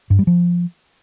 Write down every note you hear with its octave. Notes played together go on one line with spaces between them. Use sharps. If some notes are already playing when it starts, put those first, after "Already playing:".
G2
G3
F3